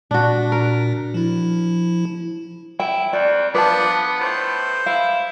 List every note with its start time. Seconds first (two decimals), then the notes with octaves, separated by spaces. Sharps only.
0.11 A#2 D4 F#4
0.52 A#4
1.14 F3 E4
2.80 E4 G5
3.13 F2 D5
3.54 F3 B3 D4 B4 A5 D6
4.20 A2 C5
4.86 E4 F5